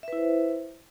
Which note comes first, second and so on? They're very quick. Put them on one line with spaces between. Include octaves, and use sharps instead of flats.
E5 B4 E4 C5